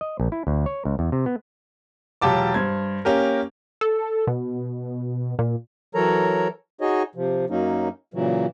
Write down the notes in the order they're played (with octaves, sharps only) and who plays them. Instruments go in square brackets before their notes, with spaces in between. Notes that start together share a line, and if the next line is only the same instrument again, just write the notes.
[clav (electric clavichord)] D#5
A#1
E4
D2
C#5
C#2
E2
C3
B3
[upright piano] E1 F#3 F4 G4 A5 D6
G2 C5 G#6
A#3 C#4 G4 A#4
[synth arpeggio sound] A4
B2
A#2
[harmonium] E3 F#3 A4 A#4 C#5 A#5
D#4 F#4 G#4 C#5 D#5
C3 F3
F#2 F#3 A#3 C#4 D#4
A#2 C#3 E3 F#3